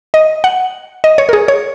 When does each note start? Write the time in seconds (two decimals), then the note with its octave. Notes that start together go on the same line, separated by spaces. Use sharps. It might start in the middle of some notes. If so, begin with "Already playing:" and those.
0.14 D#5
0.44 F#5
1.04 D#5
1.18 C#5
1.29 A#4
1.33 G#4
1.48 C#5